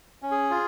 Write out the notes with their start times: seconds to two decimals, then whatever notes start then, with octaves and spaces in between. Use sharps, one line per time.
0.22 C#4
0.31 G#4
0.50 F4